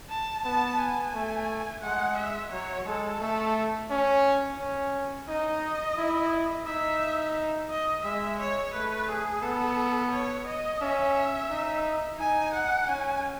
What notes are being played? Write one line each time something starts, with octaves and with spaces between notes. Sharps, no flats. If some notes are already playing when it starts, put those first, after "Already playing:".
A5
B3 A5
G#5
A3
G#3 F#5
E5
F#3 C#5
G#3 A4
A3 A4
C#4
C#4
D#4 D#5
E4
D#4 E5
D#5
G#3 E5
C#5
A3 B4
G#4
B3 A4
C#5
D#5
C#4 E5
D#4
D#4 G#5
F#5
C#4 G#5